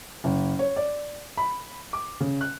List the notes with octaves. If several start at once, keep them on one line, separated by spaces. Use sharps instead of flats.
F#1
C#5
D5
B5
D6
C#3
F#6